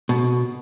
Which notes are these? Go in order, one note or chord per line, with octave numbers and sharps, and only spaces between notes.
B2